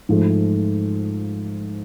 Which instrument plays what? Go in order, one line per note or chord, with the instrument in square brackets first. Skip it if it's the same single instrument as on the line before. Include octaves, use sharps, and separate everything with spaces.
[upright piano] G#2 F3 A3